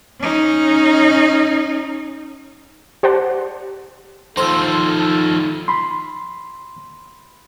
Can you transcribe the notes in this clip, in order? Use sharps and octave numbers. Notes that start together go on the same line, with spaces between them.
C#4 D#4
G4 C5 D5 F#5 A5
D#3 F3 D#4 F4 A4 C5
B5 C6